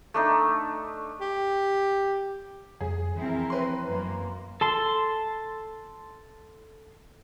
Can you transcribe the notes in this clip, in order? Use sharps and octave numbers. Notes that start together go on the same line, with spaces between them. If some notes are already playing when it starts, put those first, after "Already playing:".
A3 D4 D#4
G4
F2 G3 G#4
E3 F3 C4 E4 A#4
B4 C6
F#2 A#3
A4 A5 C6